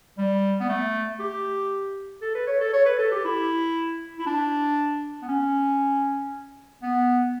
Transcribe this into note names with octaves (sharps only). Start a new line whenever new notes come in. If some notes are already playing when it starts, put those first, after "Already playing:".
G3
B3
A3
G4
A4
B4
C#5
A4
C#5
B4
A4
G4
E4
E4
D4
B3
C#4
B3